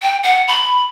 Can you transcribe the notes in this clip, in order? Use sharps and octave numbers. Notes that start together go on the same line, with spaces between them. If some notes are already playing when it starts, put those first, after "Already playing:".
G5
F#5
B5